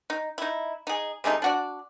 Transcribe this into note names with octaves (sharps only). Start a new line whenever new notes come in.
D#4
D#4 E4
D#4 G#4
C3 G#3 A3 D#4
D4 F#4 D5